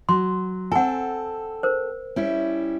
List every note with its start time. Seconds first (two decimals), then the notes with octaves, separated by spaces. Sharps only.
0.09 F#3 C6
0.72 C4 A4 F#5 G#5
1.63 A#4 C5
2.16 G3 C#4 E4